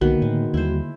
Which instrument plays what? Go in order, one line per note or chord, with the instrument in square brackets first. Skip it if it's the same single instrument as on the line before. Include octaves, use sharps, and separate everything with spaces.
[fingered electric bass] B1 [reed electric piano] D3 A#3 [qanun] D#3 B3 B4 [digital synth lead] F#4
[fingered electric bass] A2 D#3 [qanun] G#3
[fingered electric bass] D#2 G3 [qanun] E4 C5